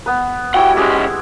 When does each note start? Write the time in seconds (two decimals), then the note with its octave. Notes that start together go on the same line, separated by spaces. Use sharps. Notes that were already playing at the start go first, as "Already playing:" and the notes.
0.06 B3 B4
0.54 G3 E4 F#4 F#5 G5
0.77 G#2 G#3 C#4 G4 D6